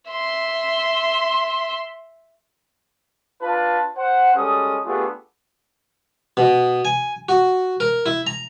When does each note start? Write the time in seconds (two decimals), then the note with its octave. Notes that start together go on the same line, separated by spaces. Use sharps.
0.11 E5 C6
3.42 D4 F4 B4 A5
3.97 C5 F#5
4.35 G3 G#3 C#4 A4 D#6
4.85 A3 B3 D4 F4 G4 G#4
6.37 B2
6.85 G#5
7.29 F#4
7.80 A#4
8.06 E4
8.27 A#5